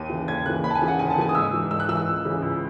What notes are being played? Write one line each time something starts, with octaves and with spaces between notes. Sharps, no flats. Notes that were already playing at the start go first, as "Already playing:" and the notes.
Already playing: D#2 D#7
C#3 E3
D#2 G#6
C#3 E3 F#6
D#2 B5
A5
G#5
C#3 E3
F#5
D#2 G#5
A5
C#3 E3 G#5
D#6
G#2 E6
E3
G#2 E6
F#6
E3 E6
C#2
C#3 E3
C#2